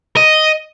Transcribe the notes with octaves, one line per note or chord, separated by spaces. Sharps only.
D#5